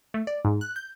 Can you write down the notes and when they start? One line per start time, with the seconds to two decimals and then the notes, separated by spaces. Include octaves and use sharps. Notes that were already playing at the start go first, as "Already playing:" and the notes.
0.14 A3
0.27 D5
0.45 G#2
0.61 F#6
0.76 G6